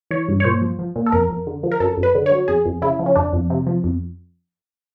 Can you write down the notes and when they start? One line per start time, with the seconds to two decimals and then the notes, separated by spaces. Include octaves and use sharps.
0.11 E3 C#5
0.28 G2
0.40 C#5
0.44 A#2 C5
0.61 F3
0.79 F3
0.96 A#2
1.06 A4
1.12 F2 A#4
1.30 F2
1.47 D3
1.63 F3
1.71 A#4
1.80 F#2 A4
1.98 F#2
2.03 B4
2.15 D3
2.26 C#5
2.31 F#3
2.48 F2 G#4
2.66 F2
2.82 C#3 E4
2.99 F3
3.06 C#4
3.16 F2 D4
3.33 F2
3.50 C3
3.67 F3
3.84 F2